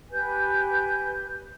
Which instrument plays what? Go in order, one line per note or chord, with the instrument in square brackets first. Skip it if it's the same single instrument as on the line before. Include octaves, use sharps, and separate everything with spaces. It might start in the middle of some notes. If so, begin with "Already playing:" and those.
[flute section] G4 B4 G#5 G6